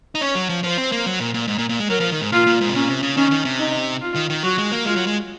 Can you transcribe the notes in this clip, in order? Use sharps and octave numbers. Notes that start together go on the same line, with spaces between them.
D#4
C#4 C#5
F#3
F3
F3 C5
C4
A#3
F#3
A#2
A#2
G#2
A#2
A#2
G#3
F#3 A#4
F3
D#3
G#2
A#2 F4
A#2
G#2
C3
A#2 C#4
C3
C#3
D#3 C#4
D#3
C3
D#4
F4
D#3
D#3
F#3 F#4
G#3
A#3
G#3 F4
F#3
G#3